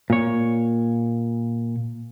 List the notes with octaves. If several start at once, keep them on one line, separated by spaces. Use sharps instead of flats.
A#2 C#5